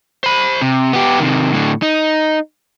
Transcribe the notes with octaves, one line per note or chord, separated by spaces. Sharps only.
C5 B5
C3
B3 G4
C3 D#3
A2 D3
D#4